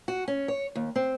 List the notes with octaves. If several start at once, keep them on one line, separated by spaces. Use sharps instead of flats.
F#4
C#4
C#5
D#2
C4